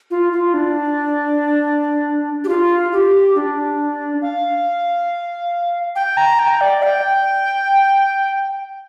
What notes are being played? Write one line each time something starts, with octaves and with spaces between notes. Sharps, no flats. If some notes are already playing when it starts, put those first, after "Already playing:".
F4
F4
D4
G4
F4
G4
D4
F5
G5
A#5
G5
D5
G5